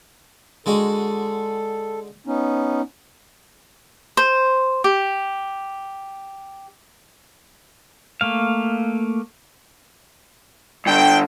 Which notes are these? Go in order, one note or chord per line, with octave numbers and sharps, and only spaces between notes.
D3 G#3 F#4 A4
B3 C#4 D#4
C5
G4
A3 A#3 F5
G2 D3 G5